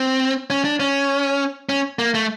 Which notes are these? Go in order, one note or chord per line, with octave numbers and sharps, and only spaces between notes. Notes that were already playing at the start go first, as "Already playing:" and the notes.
Already playing: C4
C#4
D4
C#4
C#4
A#3
A3